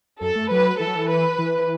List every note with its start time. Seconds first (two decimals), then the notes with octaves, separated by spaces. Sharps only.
0.21 F#2 A4
0.36 A3
0.51 F#3 B4
0.80 E3 A4
0.87 F#3
0.95 E3
1.09 B4
1.38 E3